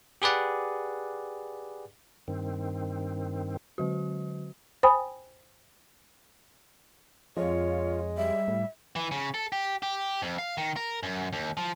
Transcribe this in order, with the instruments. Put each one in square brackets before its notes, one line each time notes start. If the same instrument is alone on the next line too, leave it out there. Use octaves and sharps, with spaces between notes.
[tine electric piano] G4 G#4 B4 D5 F#5
[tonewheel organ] G2 D#3 C4
[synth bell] D3 F#3 F#4
[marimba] C5 G5 G#5 B5 D#6
[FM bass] F2 [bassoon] G#3 [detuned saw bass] F4 [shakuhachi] C#5
[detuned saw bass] G3 [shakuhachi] E5
[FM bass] A2
[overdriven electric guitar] E3
C#3
A4
G4
G4
F2
F5
D#3
A#4
F#2
D#2
F3